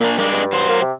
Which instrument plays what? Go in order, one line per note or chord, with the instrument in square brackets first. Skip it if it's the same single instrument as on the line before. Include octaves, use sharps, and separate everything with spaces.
[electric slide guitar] A#2 D4 [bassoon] A#3
[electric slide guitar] G3 G#3 D4 [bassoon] A#3
[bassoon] G2
[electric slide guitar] F#3 C5
[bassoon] A#3
C3